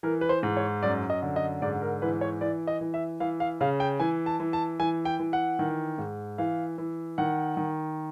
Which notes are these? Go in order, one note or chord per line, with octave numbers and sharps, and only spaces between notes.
E3 A#4
B4
C5
G#2
C#5
F#2 D5
D#5
D3
D#5
G#2 D5
A#4
E3 B4
C#5
E3 D5
D#5
E3
E5
E3 F5
F5
C#3 F5
G5
E3 G#5
A5
E3
A5
E3 G#5
G5
E3
F#5
D#3
G#2
E3 F5
E3
D#3 F#5
D#3